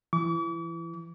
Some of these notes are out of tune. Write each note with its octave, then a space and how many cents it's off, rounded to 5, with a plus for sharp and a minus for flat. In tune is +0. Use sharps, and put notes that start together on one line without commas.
E3 +25 D6 -45